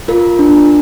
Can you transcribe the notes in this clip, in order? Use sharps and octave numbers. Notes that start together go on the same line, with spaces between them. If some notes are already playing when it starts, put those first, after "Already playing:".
F4 A#4
D4